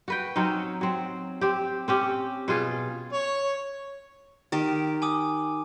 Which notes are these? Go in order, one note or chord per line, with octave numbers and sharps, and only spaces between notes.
F#4 B4 G5
F#3 C4 C#4 D#4
F#3 C4
C4 G4
C4 C#4 G4
B2 F4 G#4
C#5
D#3 G4
G#5 D6 D#6